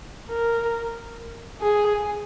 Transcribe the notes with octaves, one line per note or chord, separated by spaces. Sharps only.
A#4
G#4